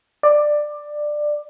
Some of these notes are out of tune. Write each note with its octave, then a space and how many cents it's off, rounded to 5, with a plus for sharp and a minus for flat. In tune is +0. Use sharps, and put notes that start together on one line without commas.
D5 +15